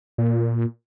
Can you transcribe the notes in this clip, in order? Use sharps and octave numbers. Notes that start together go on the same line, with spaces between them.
A#2